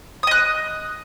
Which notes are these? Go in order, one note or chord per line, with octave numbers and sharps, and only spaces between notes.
D#5 D#6 F#6